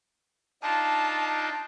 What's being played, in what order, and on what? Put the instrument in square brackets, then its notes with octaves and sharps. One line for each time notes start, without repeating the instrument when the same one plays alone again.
[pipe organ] D4 D#4 F4 [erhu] A5